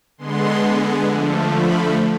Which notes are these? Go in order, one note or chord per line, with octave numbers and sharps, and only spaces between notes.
D3 G#3 B3 C6
D3 F3 A3
B5